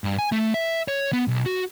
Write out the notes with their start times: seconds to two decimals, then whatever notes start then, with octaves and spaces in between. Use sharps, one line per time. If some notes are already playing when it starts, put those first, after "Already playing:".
0.04 G2
0.19 G#5
0.32 A3
0.54 E5
0.88 C#5
1.13 B3
1.28 B1
1.46 F#4